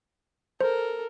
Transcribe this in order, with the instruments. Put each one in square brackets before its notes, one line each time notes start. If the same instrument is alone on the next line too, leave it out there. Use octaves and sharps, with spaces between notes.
[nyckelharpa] A4 A#4 [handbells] C5